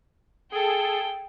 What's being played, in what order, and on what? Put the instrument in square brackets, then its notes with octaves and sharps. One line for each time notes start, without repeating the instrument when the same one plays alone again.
[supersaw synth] G#4 A4 [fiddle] G5